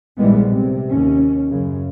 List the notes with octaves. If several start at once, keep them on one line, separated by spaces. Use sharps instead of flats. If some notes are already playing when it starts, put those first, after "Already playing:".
A#1 G#2 E3 G3 G#3 B3
C3
D#2 C#4
F#2 C#3